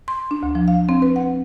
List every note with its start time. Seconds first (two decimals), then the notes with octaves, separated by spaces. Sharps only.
0.08 C6
0.31 D4
0.43 D2
0.55 F3
0.68 F5
0.89 C4
1.02 B4
1.16 F#5